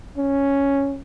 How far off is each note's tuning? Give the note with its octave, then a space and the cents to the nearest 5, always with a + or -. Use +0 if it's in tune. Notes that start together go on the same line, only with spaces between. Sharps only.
C#4 +0